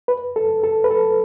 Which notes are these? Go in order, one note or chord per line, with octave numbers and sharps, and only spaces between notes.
B4
A4
A4
B4
A4